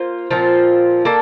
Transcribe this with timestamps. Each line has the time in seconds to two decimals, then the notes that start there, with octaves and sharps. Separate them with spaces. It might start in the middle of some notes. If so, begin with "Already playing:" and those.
Already playing: A#3 F4 C5
0.31 A#2 F3 C4 F4
1.05 A#3 D4 A4